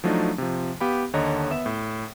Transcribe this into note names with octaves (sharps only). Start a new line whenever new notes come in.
F3 F#3 A3 D4 D#4
C3 F3
B3 G4 F5 B5
D#2 D3 C#5 D#5 A5 A#5
B3 E5 E7
A2